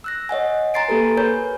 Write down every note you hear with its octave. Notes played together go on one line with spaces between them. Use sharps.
E6 F#6 A#6
C#5 D#5 F#5 G#5
G#5 A#5 C6 A6 C7 D7
A#3 G4 A4 B4
A#4 B4 C#5 G#5 G6